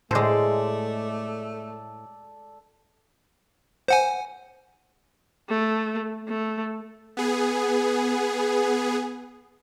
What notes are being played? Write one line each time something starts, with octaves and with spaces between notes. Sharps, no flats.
A2 G#3 A3 A4 C5 D5
C5 F#5 G#5
A3
A3
B3 G#4